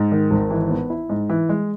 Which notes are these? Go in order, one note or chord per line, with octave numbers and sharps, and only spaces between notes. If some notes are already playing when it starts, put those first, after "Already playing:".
Already playing: G#2
D#3
G#1
E3
B3
E4
G#2
E3
G#3